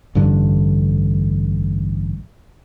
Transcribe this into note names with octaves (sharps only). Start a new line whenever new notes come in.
A1 G2 D3